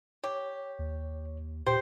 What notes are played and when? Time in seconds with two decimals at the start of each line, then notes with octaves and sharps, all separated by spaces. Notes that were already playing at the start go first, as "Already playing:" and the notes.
0.24 G4 C#5
0.79 D#2
1.66 A#2 G4 C5 G5 G6